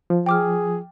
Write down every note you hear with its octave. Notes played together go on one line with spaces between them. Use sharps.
F3
G#4 G5 D6 F6